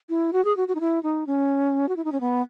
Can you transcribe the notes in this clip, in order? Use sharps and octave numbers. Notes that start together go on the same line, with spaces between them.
E4
F#4
G#4
F#4
F#4
D#4
E4
D#4
C#4
F#4
E4
D#4
C#4
B3